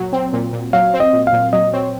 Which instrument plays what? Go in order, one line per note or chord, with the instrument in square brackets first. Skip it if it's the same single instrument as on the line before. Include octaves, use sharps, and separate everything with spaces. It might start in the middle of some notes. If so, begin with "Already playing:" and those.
Already playing: [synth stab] A#2 F#3
C4
A#2
A#2
[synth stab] F#3 [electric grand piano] F5
[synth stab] C4
[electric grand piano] D#5
[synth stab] A#2
[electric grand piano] F5
[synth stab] A#2
[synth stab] F#3 [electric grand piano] D#5
[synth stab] C4 [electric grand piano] C#5